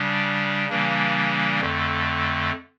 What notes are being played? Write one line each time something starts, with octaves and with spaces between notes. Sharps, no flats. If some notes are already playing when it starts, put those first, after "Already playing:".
Already playing: C#3 G3 D4
C#3 E3 G3 A#3 D4
F2 D3 A3